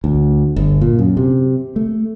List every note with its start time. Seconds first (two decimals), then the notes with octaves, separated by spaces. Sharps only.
0.04 D2
0.56 G1
0.81 A#2
0.99 F#2
1.17 C3
1.76 A3